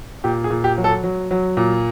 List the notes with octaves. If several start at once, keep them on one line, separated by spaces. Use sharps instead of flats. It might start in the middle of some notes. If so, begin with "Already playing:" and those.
A#2 G4
G#4
A#2
G4
F#3
A4
F#3
F#3
A#2